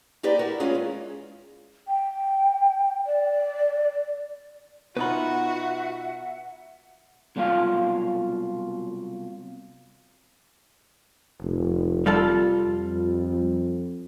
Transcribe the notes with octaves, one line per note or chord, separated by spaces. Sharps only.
A#3 D#4 G4 B4 D5
E4 F#4 A#4
G#3 A#3 B3 C#4 F4 G#4
G#3
G5
D5
B2 D#4 F4 F#4 B4 E5 F#5 B5
C2 B2 F#3 F4 A4 F5
F1
G3 F4 A4
F2